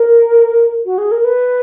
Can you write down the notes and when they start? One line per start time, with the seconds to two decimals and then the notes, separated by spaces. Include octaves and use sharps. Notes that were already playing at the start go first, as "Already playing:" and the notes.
Already playing: A#4
0.85 F#4
0.98 G#4
1.11 A#4
1.24 B4